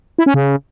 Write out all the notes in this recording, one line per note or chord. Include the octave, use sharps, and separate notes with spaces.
E4
C#4
C#3